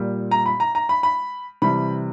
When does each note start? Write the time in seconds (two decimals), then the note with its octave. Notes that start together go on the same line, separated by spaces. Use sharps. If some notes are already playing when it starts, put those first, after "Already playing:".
Already playing: A#2 G3
0.31 A#5
0.46 B5
0.60 A#5
0.75 A#5
0.89 B5
1.03 B5
1.62 C3 E3 G3 B5